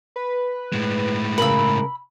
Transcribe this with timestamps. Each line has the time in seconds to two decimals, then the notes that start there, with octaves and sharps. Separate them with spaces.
0.16 B4
0.73 A2 G#3
1.38 C#3 A#4 B5 E6